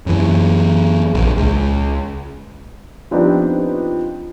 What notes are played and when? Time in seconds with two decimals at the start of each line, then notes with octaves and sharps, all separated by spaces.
0.06 F#2 E3
1.15 A#1
1.37 C#2
3.11 F3 B3 C4 D4 D#4 G4